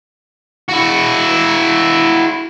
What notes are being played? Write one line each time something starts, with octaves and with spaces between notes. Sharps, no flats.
E4 F#4